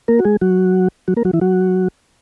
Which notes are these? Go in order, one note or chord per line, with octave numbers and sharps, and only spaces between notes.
A#3 A#4
F#4
G#3 G#4
F#3 F#4
F#3 F#4
A#3 A#4
F#3 F#4
E3 E4
F#3 F#4